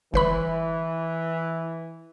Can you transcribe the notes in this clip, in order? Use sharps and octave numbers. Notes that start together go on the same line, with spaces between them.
G1 E3 B4 B5